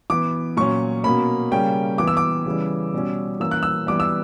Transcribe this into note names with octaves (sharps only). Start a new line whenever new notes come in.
E3 B3 D6
A#2 F#3 C#4 C#6
B2 A#3 C#4 B5
C#3 G3 A#3 C#4 G5
E3 B3 D6
E6
D6
C#3 E3 G3
B2 G3 C#4
E3 A#3 C#4 E6
F#6
E6
E3 G3 B3 D6
E6